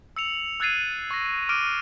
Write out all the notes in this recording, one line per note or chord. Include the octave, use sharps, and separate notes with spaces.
E6 C#7 F7
E6 F#6 G#6 A6 C7 D#7
C#6 A#6
D6 F6 D7 D#7